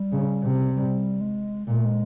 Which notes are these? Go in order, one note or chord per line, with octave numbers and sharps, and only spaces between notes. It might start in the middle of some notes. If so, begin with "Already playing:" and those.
Already playing: G3
C#3
C3
G3
G#3
A#2 G#3
A3
G#3